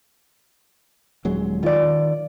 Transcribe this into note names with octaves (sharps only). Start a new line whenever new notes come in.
D#1 F#3 G#3
D#3 F4 D5